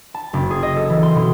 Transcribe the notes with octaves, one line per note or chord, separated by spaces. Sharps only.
A5
F#1
G#4
D#5
A4
E3
C6
B2